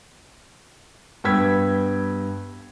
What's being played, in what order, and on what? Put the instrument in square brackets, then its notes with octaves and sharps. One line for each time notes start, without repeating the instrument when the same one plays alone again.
[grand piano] G2 B3 G5 E6 G#6 B6